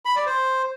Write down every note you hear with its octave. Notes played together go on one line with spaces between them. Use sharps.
B5
D5
C5